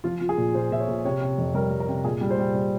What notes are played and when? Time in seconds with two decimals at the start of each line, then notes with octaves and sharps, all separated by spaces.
0.04 F3 F4
0.21 F3
0.29 G#4
0.37 A#2
0.54 A#2 C5
0.71 A#2 E5
0.80 C#5
0.88 A#2
1.05 C3 C#5
1.21 C3
1.38 F2
1.54 G3 A#4
1.71 G3
1.80 A#4
1.89 C3
2.04 A#2 G#4
2.21 G3
2.30 C5
2.39 G3
2.55 G3